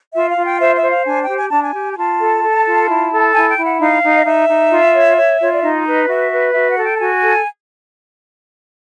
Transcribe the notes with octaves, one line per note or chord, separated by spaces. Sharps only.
F4 E5
F5
F4
G5
C5 E5
E5
C5
F5
D4 G#5
G5
G4
G#5
D4 A5
G#5
G4
G#5
F4 A5
A4
A4
F4
E4
A4
E4 G#5
G5
E4
F#5
D#4 F5
D#4
D#5
D#4 E5
D#4
F4
C#5
C#5
F4 C#5
D5
D#4 D#5
B4
F#4 E5
B4
F#4 E5
F#5
A4
G5
A5
F#4 G#5
A4